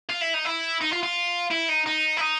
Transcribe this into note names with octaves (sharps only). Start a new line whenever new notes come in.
F4
E4
D#4
E4
D#4
F4
F4
E4
D#4
D#4
E4
D#4